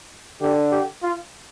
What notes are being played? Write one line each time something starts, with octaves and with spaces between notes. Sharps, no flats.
D3 G4
G4
F4